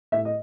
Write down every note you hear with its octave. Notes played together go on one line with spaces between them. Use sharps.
A2 E5
D#5